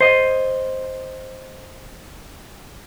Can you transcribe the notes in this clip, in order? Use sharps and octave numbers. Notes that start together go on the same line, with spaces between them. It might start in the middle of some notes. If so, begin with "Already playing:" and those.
C5 D#5